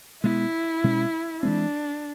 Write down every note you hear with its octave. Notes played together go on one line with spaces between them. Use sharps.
B2 G#3 B3 E4
B2 G#3 C#4
E3 G#3 C4 D4